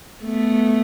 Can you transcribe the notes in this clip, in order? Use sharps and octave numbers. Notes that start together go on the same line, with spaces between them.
A3 B3